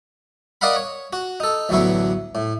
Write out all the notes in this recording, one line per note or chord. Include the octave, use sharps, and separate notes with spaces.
A#4 D5 D#5 F5 F#5 B5
C#5
F#4
D#4 A4
A1 D2 F#3 B3 E4 C#6
A2